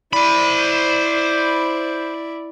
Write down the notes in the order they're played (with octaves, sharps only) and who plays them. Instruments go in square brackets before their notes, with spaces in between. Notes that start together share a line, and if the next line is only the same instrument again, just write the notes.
[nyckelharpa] E4 D5 [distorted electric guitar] C5 B5